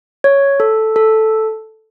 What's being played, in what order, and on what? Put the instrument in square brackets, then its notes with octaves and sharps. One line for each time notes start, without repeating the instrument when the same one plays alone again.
[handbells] C#5
A4
A4